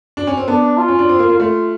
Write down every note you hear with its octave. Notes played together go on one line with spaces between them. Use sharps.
D4
C#4
C4
B3 D4
F4
C#4
D4
C4
A#3
A#3
A3 F4